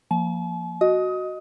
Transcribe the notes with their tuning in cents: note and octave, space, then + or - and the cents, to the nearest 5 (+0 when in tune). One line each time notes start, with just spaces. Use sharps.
F3 +0 A#3 +0 A5 -45
F#4 +0 D#5 +0 D#6 +25